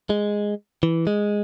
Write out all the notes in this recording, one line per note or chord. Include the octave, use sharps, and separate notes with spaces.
G#3
E3
G#3